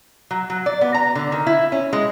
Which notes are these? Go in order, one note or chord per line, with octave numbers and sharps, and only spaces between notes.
F#3
F#3
D5
B3
A#5
D3
D#3
E4
C#4
G#3